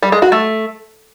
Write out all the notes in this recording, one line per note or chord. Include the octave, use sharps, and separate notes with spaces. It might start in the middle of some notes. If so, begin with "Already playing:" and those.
G3
G#3
F#4
A3